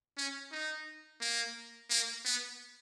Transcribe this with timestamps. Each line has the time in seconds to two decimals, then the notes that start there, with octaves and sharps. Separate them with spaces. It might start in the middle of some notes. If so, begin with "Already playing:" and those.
0.17 C#4
0.52 D#4
1.21 A#3
1.90 A#3
2.25 B3